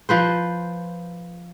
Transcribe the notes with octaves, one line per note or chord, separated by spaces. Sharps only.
F3 B4 C5